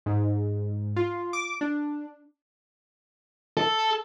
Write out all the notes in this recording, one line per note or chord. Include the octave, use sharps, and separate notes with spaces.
G#2
F4
D6
D4
A4